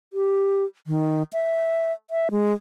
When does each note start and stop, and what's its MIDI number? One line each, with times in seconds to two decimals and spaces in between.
0.13 0.64 67
0.87 1.23 51
1.33 1.92 76
2.11 2.29 76
2.31 2.53 56